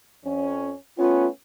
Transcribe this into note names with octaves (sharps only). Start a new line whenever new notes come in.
F2 C#4
A3 B3 C#4 F4